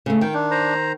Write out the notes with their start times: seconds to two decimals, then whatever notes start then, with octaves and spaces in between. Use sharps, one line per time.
0.06 C#3 A3
0.21 D#3 G5
0.34 D4
0.51 C5 A#5